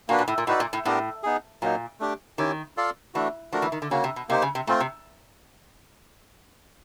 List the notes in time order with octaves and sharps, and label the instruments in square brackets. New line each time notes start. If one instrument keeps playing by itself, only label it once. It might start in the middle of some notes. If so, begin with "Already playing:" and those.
[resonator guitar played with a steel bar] A#2 [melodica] A#3 D4 F#4 B4
[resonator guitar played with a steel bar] A#2
A2
A#2
[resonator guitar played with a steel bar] A2 [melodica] D#4 F#4 B4 D5
[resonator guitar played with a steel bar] A#2
A2
[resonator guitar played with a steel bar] A2 [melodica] B3 D4 G4 A#4
[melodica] B3 D#4 G#4
[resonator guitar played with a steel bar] A#2 [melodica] F#3 A#3 D#4
[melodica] A3 D4 G4
[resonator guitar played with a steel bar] D#3 [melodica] C#4 E4 G4
[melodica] F4 A4 D5 F5
[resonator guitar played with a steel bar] E3 [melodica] A3 D4 F#4
[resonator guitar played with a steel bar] F3 [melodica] A3 D4 F#4 A#4
[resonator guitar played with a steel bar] E3
D#3
D3
[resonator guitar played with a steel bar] C#3 [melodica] A#3 C#4 F#4
[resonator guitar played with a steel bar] C3
B2
[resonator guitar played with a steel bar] C3 [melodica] A#3 D#4 G4 C5
[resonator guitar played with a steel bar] C#3
C3
[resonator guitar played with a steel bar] A#2 [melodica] A3 C4 F4
[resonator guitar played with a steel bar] C3